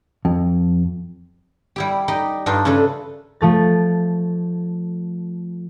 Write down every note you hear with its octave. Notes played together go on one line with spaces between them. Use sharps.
F2
G3 E4 G4
D#4 G4 D#5
G2 D4 D#4 F4
C#3 A3 D4 A4 B4
F3 A3 A6